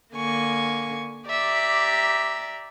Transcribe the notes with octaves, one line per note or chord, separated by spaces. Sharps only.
D3 A#3 G#5 C#6
G4 D5 E5 A#5